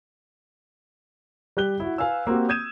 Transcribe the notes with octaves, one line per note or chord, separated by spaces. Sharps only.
G3 G4 F#6 G7
E4 F#4
B4 F5 G#5 E6
A#3 C4 F#4 G4
D#6 G6 G#6 D#7 E7